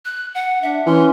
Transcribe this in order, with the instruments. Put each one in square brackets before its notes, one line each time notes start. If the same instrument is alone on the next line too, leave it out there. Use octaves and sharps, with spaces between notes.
[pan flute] F#6
F#5
[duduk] D4 [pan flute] E5
[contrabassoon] E3 [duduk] C#4 [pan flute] C6